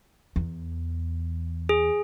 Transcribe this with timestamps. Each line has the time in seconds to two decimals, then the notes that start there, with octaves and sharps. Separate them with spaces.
0.36 E2
1.69 G#4